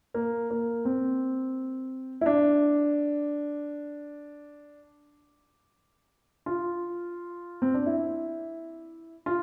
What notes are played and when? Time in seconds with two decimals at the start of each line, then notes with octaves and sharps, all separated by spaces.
0.14 A#3
0.51 A#3
0.85 C4
2.21 E4
2.26 D4
6.46 F4
7.62 C4
7.74 D4
7.86 E4
9.26 F4